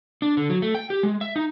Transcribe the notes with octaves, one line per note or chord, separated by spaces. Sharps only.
D4
D3
F#3
A3
G5
G4
G#3
E5
D#4